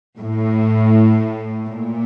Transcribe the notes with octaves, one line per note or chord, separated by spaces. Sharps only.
A2
A#2